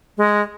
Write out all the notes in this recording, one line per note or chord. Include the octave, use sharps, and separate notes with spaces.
G#3